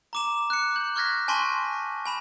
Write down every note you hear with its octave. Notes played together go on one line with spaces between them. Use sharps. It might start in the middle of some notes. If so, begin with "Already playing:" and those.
A#5 D6 E7
F#6 C#7
G6 F#7
C#6 F6 F#6 G#6 A#6 B6
G#5 A5 C6 C#6 B6 D#7
G#5 B5 E7